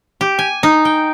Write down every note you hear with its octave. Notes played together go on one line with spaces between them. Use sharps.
G4
G#5
D#4
G5